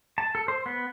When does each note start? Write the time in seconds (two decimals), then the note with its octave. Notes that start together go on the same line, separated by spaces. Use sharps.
0.18 A5
0.35 A4
0.48 C5
0.66 B3